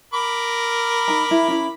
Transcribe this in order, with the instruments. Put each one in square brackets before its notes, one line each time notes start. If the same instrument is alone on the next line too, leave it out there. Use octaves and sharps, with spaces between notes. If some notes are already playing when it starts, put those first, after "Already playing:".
[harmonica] A#4 B5 D6
[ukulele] D#4 A#5
E4
C#4 E4